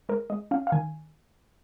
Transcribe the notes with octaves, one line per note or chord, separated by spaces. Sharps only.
G#3 A#4
G#3 D#5
C#4 F5
F5
D#3 G#5